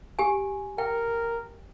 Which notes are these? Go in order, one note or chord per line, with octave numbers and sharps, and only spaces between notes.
G4 G#5
A#4 G5